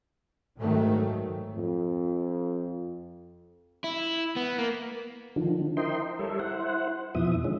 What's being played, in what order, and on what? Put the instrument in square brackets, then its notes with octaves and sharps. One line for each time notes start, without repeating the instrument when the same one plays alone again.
[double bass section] G#2 D#3 F#3 A3
[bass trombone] F2
[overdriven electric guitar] E4
B3
A#3
[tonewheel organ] D3 D#3 F3
E4 A#4 C5 D#5 G5 C6
G3 A4 A#4 C#5 E5
E4 C5 F#5
F2 B2 E3 F3 E5 D#6
D3 D#3 G#3 C#4